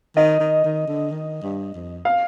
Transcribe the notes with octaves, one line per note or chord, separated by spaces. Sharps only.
D#3 D#5
D#3
D#3
D3
D#3
G2
F2
F5